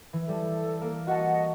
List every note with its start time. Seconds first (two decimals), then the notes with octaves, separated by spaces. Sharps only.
0.13 E3
0.29 G3 A4
0.81 A#3
1.07 F#4 D#5 F#5 A5